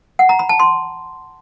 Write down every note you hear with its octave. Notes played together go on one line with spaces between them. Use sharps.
F#5
A#5
B5
A5
C6